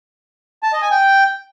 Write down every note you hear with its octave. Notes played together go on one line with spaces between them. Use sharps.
A5
D#5
G#5
G5